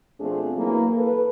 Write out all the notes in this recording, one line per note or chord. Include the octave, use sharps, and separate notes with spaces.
B2 F3 A3 C4 D4 G#4
E3 F#3 A#3
A4 B4